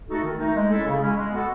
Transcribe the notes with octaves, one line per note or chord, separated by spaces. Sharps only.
A3 D#4 F#4 A4
D#3
A3 D#4
G#3
C#4 E4 A4
C#3
G#3 C#4 E4
G#3
B3 F#4 A4